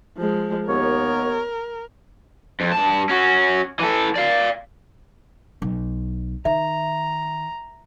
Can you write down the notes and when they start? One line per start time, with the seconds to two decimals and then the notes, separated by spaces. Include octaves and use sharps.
0.17 F3 G#3
0.68 D#2 B3 A#4 C#5
2.61 F2
2.73 G2 A5
3.09 C#4 F#4
3.80 E3 A4
4.15 D5 F5
5.62 B1
6.45 D#3 E5 A#5